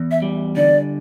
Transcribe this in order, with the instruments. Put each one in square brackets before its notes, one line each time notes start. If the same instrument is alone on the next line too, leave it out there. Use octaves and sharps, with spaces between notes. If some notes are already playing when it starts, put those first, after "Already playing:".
Already playing: [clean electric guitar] E2
[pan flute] E5
[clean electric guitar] G3
[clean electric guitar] D3 [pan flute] D5